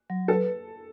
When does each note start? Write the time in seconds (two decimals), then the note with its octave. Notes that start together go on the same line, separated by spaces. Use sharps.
0.10 F#3
0.28 A4 B4